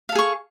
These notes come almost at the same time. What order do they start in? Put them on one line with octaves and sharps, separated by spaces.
F5 A4 G#4 C#6